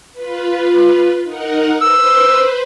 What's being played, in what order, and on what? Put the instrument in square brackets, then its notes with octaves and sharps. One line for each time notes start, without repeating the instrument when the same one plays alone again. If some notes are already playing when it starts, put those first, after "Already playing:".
[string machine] F4 B4
D#4 A#4 F#5
[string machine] B4 C5 [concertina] E6